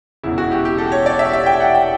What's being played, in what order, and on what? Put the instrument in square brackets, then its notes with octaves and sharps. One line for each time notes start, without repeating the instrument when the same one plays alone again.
[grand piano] E1 E2 C#3 E4
F#4
G4
G4
A4
C#5
D5
E5
E5
G5
F#5
G5